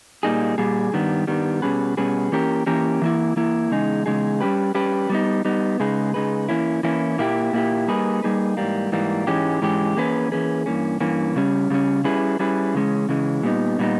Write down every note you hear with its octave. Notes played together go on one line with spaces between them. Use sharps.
A#2 G3 A#3 D#4 G#4
A#2 G3 G#4
G2 D#3 G3 B3
G2 D#3 G3 B3
B2 G3 C#4 G#4 B4
B2 G3 C#4 G#4 B4
E3 A#3 C#4 G4 A#4
E3 A#3 C#4 G4 A#4
E3 A#3 E4
E3 A#3 E4
E2 C#3 G#3 D#4 G#4
E2 C#3 G#3 D#4 G#4
G3 C#4 G4 B4
G3 C#4 G4 B4
G3 B3 D#4
G3 B3 D#4
C#3 G#3 D#4 G#4 B4
C#3 G#3 D#4 G#4 B4
E3 A#3 C#4 E4
E3 A#3 C#4 E4
A#2 A#3 E4 G4
A#2 A#3 E4 G4
G3 A#3 D#4 G#4 B4
G3 A#3 D#4 G#4 B4
G#2 E3 G3 A#3
G#2 E3 G3 A#3
G#2 E3 G#3 C#4 G4
G#2 E3 G#3 C#4 G4
E3 A#3 C#4 G#4 B4
E3 A#3 C#4 G#4 B4
G2 E3 A#3 C#4
G2 E3 A#3 C#4
C#3 G3 C#4
C#3 G3 C#4
G3 C#4 E4 G#4 B4
G3 C#4 E4 G#4 B4
C#3 E3 G#3 C#4
C#3 E3 G#3 C#4
A#2 G3 B3 D#4
A#2 G3 B3 D#4